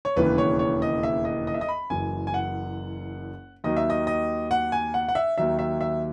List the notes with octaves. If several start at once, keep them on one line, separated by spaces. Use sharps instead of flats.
C#5
E1 D#2 C#3 E3 B4
C#5
C#5
D#5
E5
D#5
D#5
E5
D#5
B5
F#1 F#2 E3 G#5
G#5
F#5
D#2 D#3 F#3 D#5
E5
D#5
D#5
F#5
G#5
F#5
F#5
E5
D#2 D#3 F#3 E5
E5
E5